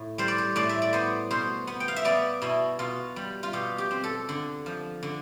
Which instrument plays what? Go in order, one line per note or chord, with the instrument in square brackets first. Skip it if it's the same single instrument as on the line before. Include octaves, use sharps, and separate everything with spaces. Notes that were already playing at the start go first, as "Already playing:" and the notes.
Already playing: [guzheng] A2
G3 C5
D5
C5
A2 D5
E5
D5
B3 C5
B2 C5
B3
G5
F5
E5
B3 D5
B2 E4
B2 F4
G3
F4
B2 G4
G4
C4
A4
D3
F3
D3